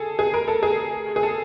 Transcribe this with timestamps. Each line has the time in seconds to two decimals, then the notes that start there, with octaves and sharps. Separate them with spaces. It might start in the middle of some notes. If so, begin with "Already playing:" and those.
Already playing: G#4 A4
0.19 G#4
0.34 A#4
0.48 A4
0.63 G#4
1.16 G#4
1.23 A4